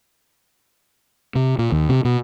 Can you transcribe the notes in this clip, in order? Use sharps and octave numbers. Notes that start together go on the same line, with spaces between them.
C3
A#2
D#2
C3
B2